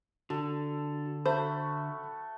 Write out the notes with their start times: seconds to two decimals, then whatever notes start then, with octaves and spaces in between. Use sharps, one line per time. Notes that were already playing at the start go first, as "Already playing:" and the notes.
0.30 D3 D4 F#4 A4
1.26 A3 F#4 C5 B5